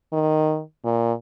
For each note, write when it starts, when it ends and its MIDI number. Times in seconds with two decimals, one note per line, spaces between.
0.13 0.61 51
0.85 1.13 46